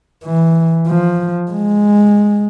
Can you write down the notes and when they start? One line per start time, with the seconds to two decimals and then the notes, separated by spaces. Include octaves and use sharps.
0.24 E3
0.87 F3
1.51 G#3